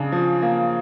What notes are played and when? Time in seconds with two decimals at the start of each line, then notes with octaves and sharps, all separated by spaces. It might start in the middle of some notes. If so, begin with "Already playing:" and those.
Already playing: C#3 D4
0.12 F3
0.42 A#3